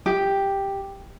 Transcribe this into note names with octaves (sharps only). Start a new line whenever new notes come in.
G4